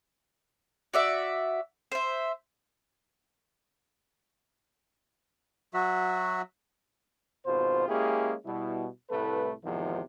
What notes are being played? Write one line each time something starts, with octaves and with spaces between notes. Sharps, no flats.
F#4 D5 E5
C5 E5
F#3 F#4 E5
G#1 B2 F4 C5
G#3 A#3 C#4 E4 G4 G#4
B2 G3 E4
C2 A2 A3 A4 B4
E2 G#2 C3 D#3 F3